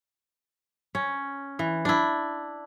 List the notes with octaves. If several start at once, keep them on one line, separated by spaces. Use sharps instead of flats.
C#4
E3
D4 E4